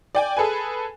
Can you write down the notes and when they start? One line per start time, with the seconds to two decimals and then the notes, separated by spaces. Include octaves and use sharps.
0.15 D5 G5 G#5
0.37 G#4 A4 B4 G#5